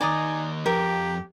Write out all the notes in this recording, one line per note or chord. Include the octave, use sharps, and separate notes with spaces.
D#2 D#4 D5 G#5 A#5 D#6
F2 G4 A#4